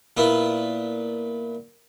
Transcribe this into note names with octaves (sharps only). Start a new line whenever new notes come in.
A#2 B3 E4 F4